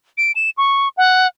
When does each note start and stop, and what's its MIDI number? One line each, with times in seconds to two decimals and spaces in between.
0.17 0.32 98
0.35 0.50 100
0.57 0.89 85
0.97 1.27 78